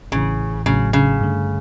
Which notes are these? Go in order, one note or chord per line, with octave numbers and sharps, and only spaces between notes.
A1 A2 C#3 E3
A1 A2 C#3 F#3
C#3
G2 D3 A3